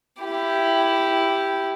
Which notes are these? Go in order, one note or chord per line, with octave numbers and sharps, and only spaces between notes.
E4 G4